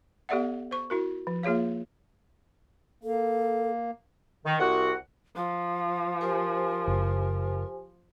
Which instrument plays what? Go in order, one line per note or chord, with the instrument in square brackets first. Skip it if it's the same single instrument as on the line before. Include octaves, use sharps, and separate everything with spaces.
[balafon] B3 G4 A4 D5 E5 F#5
C5 C#6
E4 F#4 A#4
F3
A#3 F4 G#4 C#5 F5
[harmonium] A#3 [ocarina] A4
[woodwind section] D#3
C2 F#4 F#5
[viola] F3 [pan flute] F5
[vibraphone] G4 C5 G#5 [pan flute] A#4
[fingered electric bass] F#1